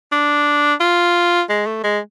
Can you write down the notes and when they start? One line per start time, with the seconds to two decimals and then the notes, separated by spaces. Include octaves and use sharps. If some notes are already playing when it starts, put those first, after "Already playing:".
0.12 D4
0.81 F4
1.50 G#3
1.66 A3
1.84 G#3